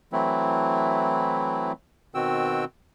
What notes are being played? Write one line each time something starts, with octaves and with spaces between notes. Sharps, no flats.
E3 F#3 A3 C4 E4
B2 D#3 C4 F#4 G5 E6